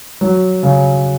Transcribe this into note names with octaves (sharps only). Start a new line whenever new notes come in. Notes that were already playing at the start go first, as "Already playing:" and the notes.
F#3
C#3